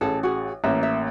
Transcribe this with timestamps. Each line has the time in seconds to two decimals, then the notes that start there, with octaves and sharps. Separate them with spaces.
0.01 A1 G#4 A4
0.23 F#4 G#4
0.64 A1 A#3 E5 A#5
0.83 E5